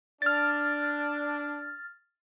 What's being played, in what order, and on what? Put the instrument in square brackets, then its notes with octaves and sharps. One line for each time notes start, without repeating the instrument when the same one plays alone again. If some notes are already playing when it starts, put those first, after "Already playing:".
[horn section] D4 [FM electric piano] F6 A6